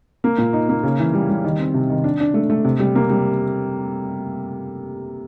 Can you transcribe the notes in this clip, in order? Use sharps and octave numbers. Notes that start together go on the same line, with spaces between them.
A#3
A#2
D#4
A#3
C#3
E3
G3
G3
D#3
C4
C3
D#3
D4
D4
A3
A3
C3
G3
A#3
G3